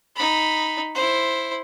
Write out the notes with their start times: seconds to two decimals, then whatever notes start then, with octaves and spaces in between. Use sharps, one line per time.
0.16 D#4 B5
0.94 E4 C5